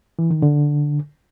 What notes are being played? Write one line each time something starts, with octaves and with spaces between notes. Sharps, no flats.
E3
D#3
D3